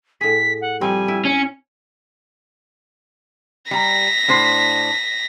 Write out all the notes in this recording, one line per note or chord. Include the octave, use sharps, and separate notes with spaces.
A2 G#4 B6
F#5
F3 G3 C4 G#5
E4
C#4 C#7
G3 A#5 A#6 B6
A2 D4 C5